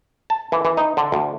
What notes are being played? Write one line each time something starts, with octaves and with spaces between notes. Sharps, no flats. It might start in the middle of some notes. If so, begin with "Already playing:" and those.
A5
E3
E3
D#4
D3
D2